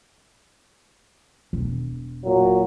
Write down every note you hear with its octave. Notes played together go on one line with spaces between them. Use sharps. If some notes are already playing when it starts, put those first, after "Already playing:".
E1
A#2 F#3